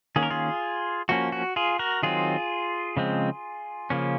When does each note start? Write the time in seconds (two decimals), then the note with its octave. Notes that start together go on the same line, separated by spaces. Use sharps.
0.16 D#3 A#3 C#4 G#4
0.23 A#4
0.31 F4 G#4
1.09 F3 A#3 C#4 F#4
1.32 F#4
1.56 F4 G#4
1.79 F#4 A#4
2.03 D#3 F#3 C4 F4 G#4
2.97 C#3 F3 G#3 C4
3.90 C#3 F3 A#3 C#4